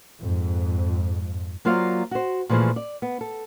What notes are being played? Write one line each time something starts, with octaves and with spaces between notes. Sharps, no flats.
F2 G#2
F#3 A#3 F4 C5 D5 F5
F#4 C5
A#2 E3 F3 A3 G#4
D5
B3
A4